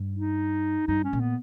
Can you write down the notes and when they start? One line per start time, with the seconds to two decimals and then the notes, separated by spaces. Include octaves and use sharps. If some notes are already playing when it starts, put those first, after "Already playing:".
Already playing: G2
0.15 D#4
0.88 G2 D#4
1.04 C#4
1.13 A#2
1.20 B3